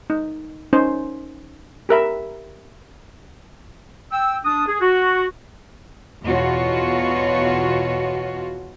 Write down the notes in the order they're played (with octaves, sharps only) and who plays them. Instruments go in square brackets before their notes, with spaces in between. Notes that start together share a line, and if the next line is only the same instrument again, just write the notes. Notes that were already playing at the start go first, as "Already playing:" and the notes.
[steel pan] D#4
C#4 D#4 C5
G4 A#4 E5 B5
[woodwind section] G5 E6
D4 D#6
G#4
F#4
[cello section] E2 B2 F4 F#4 C#5